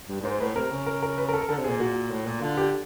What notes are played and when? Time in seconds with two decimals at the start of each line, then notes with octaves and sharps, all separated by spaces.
0.09 G2
0.20 G2
0.24 G#2 C5
0.40 A2 B4
0.56 C3 A#4
0.71 C#3
0.86 A#4
1.02 A#4
1.18 B4
1.29 A#4
1.34 A4
1.41 A#4
1.49 D3 A4
1.59 C3
1.64 A#2 G#4
1.80 A#2 F#4
2.11 A2
2.26 A#2
2.42 D3 F4
2.57 G4